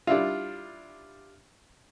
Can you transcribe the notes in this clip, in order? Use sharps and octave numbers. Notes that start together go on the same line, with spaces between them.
G3 D4 E4 F4